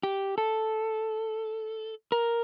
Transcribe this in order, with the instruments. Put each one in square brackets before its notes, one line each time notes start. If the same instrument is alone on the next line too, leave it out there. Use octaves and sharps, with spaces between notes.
[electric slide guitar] G4
A4
A#4